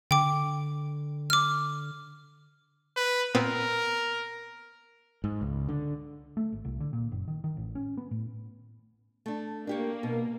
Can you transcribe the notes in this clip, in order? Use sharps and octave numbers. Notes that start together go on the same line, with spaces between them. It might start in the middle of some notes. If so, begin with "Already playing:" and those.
D3 G5 D6
D6 F6
B4
A#2 B3 C4 A#4
G#2
C#2
D3
A3
G#1
C2
D3
A#2
F#1
D#3
D#3
A1
C#4
B3
A2
A3 D4
A#3 D4 G4 C#5
B2